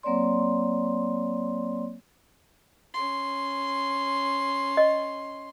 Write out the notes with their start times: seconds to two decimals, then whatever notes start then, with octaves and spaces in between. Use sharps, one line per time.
0.03 F#3 A#3 C4 C#5 D5 C6
2.94 C#4 C6
4.77 D#5